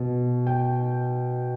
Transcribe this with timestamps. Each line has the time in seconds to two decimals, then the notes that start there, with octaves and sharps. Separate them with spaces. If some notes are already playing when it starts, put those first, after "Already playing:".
Already playing: B2
0.47 G5